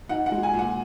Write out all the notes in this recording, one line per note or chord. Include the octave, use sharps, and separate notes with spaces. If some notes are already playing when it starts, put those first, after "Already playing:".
D#4 F#5
F#5
G#3
G#5
A#2
F#5